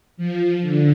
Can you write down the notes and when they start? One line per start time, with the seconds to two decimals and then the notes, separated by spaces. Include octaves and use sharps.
0.17 F3
0.61 D3